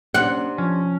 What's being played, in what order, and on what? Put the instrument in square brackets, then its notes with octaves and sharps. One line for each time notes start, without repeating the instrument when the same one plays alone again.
[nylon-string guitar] C3 D4 [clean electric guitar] A#3 C#4 [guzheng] F#5
[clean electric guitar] F3 [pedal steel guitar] C#4